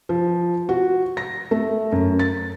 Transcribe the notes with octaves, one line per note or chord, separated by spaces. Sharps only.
F3
F#4
A#6
A3
F#2
A6